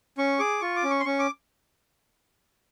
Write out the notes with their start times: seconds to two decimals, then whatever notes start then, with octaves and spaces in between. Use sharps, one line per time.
0.18 C#4 C#6
0.39 G#4 D6
0.61 F4 C#6
0.76 D6
0.83 C#4
0.90 C#6
1.00 C6
1.05 C#4 C#6
1.19 D6